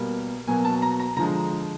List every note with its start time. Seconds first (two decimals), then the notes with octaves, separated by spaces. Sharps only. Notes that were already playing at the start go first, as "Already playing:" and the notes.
Already playing: B2 G3 A#3
0.48 B2 F#3 A#3 G#5
0.65 A5
0.82 A#5
1.00 A#5
1.17 D3 F3 G#3 A#5